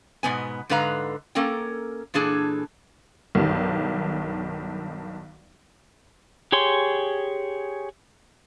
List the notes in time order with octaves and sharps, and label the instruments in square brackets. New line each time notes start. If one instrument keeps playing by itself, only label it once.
[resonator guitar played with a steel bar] G#2 B2 B3 G#5
G#2 D3 G#3 B4 F5 A#5
A#3 C#4 A4 A#4 G5
A#2 E3 D4 G#4 A4
[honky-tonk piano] B1 G2 D#3
[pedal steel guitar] G4 G#4 C#5 C6